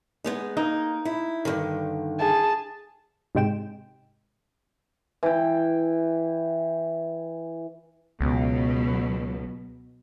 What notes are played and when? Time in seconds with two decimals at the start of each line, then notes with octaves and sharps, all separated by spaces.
0.24 G#3 B3 D#4
0.57 A#3 D#4
1.05 E4
1.45 G2 D3 D#3
2.19 G#4 A5
3.35 G#2 C3 G#3 G5 E7
5.23 E3 G5
8.21 C#2 B2 F#3